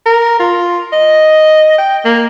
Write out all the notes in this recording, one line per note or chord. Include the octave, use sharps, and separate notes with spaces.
A#4
F4
D#5
G5
A#3